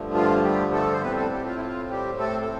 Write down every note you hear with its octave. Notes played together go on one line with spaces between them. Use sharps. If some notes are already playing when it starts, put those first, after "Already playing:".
Already playing: G2 D3 F3 A3
F4
G3 G4
A3 A4
C5
A2 G3 B3 C4 B4
A3 A4
G3 G4
F4
E4
F4
G3 G4
A3 A4
A4